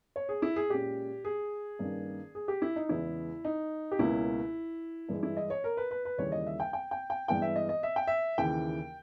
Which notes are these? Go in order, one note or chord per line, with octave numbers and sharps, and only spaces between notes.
C#5
G#4
E4
G#4
A#2 G#3 C#4 G4
G#4
G2 D#3 A#3 C#4
G#4
G4
E4
D#4
E2 C#3 G#3 B3 E4
D#4
G4
C#2 B2 A#3 C#4 E4
G2 E3 G#3
E4
D#5
C#5
A#4
B4
B4
B4
D#2 C#3 E3 G3 C#5
D#5
E5
G5
G5
G5
G5
G2 E3 G#3 B3 G5
E5
D#5
D#5
E5
G5
E5
D#2 C#3 E3 G5